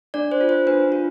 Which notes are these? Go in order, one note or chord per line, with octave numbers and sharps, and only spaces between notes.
D4 D5
C5
F4
C5
D4 B4
F4